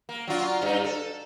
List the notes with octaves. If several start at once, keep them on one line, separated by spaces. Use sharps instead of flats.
A#3
F#3 D4 F4
G2 D#4
A4